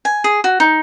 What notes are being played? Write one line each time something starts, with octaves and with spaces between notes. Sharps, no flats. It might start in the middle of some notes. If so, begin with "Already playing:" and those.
G#5
G#4
F#4
D#4